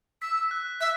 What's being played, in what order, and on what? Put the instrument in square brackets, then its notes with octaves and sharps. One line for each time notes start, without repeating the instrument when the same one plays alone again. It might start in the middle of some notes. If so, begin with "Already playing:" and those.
[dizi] E6 [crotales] B6
[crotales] B6
F#6
[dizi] E5 [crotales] F#6